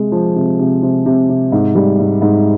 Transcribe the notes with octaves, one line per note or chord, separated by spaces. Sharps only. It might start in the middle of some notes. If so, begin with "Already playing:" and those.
Already playing: C3 G#3
F3
C3
C3
C3
C3
C3
G#2
G3
G#2
G#2